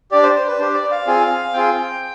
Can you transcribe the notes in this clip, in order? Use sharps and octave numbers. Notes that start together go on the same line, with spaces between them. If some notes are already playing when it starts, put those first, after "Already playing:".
D4 G4 D5
C5
C5
B4
D4 G4 C5
D5
F5
C4 F4 G#4
C4 F4 G#4 G5